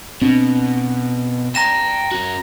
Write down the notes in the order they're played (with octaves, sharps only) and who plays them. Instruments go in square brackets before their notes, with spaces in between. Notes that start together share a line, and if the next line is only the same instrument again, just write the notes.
[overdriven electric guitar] B2 [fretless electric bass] C4 D4
[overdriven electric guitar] G5 A5 [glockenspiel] A#5 A#6 E7
[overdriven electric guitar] C#4 F#4